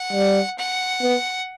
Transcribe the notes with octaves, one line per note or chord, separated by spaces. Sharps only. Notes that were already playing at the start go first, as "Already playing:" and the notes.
Already playing: F#5
G3
F#5
B3